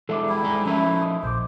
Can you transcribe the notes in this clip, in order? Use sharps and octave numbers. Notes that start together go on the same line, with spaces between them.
E3 G#3 D4 A4 E5 D6
G3 E4
G#3 G#5 A#5
F3 A3 C#4 E4 A#4 E5
D#5 D#6
A#1 A#2 C5 D6